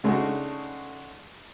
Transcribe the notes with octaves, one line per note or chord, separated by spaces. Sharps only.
C#3 G#3 A3 D4 D#4 F#4